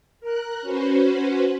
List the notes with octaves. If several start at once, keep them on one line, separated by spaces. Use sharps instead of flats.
A#4 F#6
C#4 F#4 B4 C5